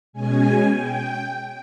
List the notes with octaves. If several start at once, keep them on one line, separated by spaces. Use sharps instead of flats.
B2 G#3 C#4 G#5
G5